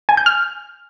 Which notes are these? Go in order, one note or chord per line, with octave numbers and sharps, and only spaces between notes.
G#5
G6
F6